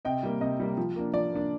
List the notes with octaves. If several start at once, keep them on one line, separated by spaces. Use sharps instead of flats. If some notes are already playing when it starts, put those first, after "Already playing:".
C3 D#5 G5
G3 A#3
C3 D#5
G3 A#3
F3
A#3 D4
F3 D5
A#3 D4